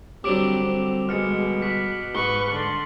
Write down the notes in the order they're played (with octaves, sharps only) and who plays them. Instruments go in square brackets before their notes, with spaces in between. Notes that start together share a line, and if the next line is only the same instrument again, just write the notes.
[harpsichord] D3 F#3 G3 [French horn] C4 [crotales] D6 D7 F7
[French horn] C4
[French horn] B2 [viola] G#3 [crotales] F6 C#7
[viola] F#4 [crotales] B6
[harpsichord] G#2 [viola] B4 C#6 [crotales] G7
[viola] D3 C6 [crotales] F#7